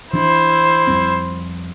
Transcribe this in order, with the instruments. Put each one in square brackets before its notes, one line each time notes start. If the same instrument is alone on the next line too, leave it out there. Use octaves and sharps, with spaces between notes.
[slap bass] E3 D4 [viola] E4 C5
[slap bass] F2 G3 C4